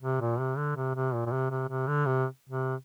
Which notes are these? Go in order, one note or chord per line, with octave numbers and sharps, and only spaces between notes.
C3
A#2
C3
D3
C3
C3
A#2
A#2
C3
C3
C3
D3
C3
C3